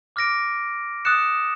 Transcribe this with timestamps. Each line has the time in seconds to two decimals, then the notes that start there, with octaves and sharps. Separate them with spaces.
0.16 D6 F6 A#6 D7
1.05 D#6 F#6 A6 C#7 E7